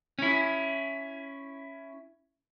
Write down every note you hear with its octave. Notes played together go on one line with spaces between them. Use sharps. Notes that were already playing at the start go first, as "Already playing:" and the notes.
C#4 E4